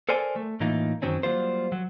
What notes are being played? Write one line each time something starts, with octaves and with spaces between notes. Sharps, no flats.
A4 A#4 C5 D5 G#5
A3
A2 E3 A#3 D#4 F4
F#2 D#3 F#3 C4 C#4
F#3 G3 A#3 F4 C5
F#3